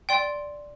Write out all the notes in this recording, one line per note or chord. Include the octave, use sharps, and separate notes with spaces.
D5 G5 C6